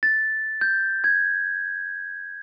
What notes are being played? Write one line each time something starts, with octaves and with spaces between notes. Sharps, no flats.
A6
G6
G#6